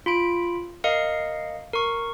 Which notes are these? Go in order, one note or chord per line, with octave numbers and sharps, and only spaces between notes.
F4 B5 D7
A#4 D#5 F5 C#7
A#4 C#6